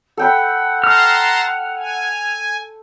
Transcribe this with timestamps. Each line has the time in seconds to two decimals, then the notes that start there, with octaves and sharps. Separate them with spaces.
0.17 A4 F#5 G5 B5
0.84 A5 A#5 C6 F6
1.77 G#5